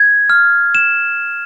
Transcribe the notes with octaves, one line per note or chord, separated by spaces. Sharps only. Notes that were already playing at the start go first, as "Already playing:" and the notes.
Already playing: G#6
F6
E7